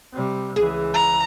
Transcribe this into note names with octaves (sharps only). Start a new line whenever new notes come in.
C3 G3
C#2 E3 G#4
A#5